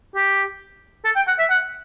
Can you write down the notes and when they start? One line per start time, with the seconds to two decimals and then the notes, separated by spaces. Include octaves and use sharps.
0.15 G4
1.04 A4
1.16 G5
1.28 F#5
1.39 E5
1.50 F#5